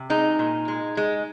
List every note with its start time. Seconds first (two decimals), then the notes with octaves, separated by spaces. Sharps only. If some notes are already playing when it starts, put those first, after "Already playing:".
Already playing: C3
0.10 G#3 D#4
0.39 A#2
0.68 G#3
0.97 G#3